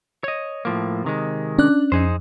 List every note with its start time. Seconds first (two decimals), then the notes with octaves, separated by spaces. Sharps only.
0.24 C#5 D#5
0.65 A2 F3 A#3
1.04 C3 D#3 G#3
1.58 C#4 D4 D5 F#6
1.92 F2 D#4 G#4 C5